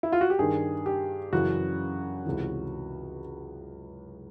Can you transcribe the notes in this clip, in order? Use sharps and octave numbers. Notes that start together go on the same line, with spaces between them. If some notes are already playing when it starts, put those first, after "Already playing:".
E4
F4
F#4
G4
G2 D#3 G#4
G4
F#2 C#3 E3 F#4
C#2 C3 E3